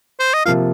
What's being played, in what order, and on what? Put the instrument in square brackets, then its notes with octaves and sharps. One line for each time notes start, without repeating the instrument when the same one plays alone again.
[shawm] C5
D#5
[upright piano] C3 F3 A#3 F4 [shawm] F5